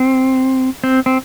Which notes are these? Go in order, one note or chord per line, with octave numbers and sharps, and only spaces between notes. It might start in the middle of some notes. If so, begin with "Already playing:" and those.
Already playing: C4
C4
C4